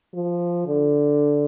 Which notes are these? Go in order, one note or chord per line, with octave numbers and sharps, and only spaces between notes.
F3
D3